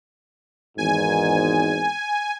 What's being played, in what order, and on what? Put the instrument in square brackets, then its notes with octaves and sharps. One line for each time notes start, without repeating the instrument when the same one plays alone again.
[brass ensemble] G#1 E2 G#2 [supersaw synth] G#5